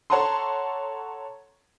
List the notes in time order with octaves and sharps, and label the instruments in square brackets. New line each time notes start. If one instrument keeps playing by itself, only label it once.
[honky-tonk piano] A4 C#5 F#5 A5 A#5 C6